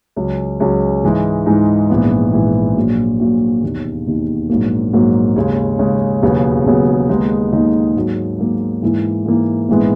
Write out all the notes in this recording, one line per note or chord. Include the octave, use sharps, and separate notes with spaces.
C#2 C#3 F#3
C#2 C#3 F#3
G#2 E3 G#3 D#4
G#2 E3 G#3 D#4
A#1 G#2 E3 B3
A#1 G#2 E3 B3
A#1 A#2 F#3
A#1 A#2 F#3
E1 D#2 D#3
E1 D#2 D#3
A#1 G#2 F#3 A#3
A#1 G#2 F#3 A#3
D#2 C#3 G#3
D#2 C#3 G#3
E1 D#2 C#3 F#3 B3
E1 D#2 C#3 F#3 B3
D#2 D#3 G#3 B3 D#4
D#2 D#3 G#3 B3 D#4
G#2 F#3 A#3
G#2 F#3 A#3
G#2 E3 A#3 E4
G#2 E3 A#3 E4
A#1 G#2 E3 G#3 B3